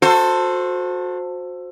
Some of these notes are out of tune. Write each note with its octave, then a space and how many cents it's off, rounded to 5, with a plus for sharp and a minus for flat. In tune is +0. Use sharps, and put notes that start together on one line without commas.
F#4 -30 A4 +15 C5 +0